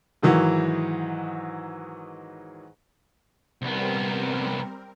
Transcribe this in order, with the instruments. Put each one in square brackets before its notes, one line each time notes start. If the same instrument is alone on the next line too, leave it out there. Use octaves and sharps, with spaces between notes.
[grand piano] G#2 D#3 E3 F#3
[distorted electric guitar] C2 B3 [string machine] G3 C4 A#4